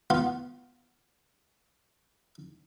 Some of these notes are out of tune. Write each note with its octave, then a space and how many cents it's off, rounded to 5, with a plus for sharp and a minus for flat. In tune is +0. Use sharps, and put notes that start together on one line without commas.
B3 +0 F4 +0